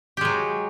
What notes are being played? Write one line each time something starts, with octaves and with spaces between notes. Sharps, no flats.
F#3 G#3 G4